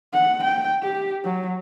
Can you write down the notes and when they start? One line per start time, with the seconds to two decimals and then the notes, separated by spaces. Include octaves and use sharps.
0.13 F#5
0.43 G5
0.82 G4
1.24 F#3